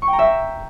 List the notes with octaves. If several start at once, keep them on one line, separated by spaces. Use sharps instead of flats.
C#6
G5
A#5
E5